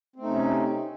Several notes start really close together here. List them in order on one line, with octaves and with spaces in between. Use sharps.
C4 A3 D#4 C3 C#4